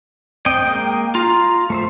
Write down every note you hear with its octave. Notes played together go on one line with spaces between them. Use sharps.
C4 D#5 G5
G#3 A#3 D#6
F4 A#5
A3 C5 E5